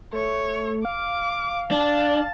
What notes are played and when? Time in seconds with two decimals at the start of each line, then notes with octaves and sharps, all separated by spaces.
0.13 A3 C#5
0.85 F5 D6
1.71 D4 A5